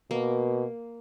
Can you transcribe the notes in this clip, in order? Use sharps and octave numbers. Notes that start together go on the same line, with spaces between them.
B2 A#3